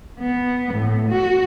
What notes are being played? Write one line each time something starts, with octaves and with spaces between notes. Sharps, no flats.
B3
A2
F#4